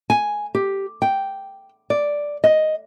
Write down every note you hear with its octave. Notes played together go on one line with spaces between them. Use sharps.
G#5
G4
G5
D5
D#5